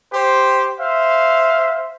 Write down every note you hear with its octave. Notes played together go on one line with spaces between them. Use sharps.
G4 C5
C5 E5 F5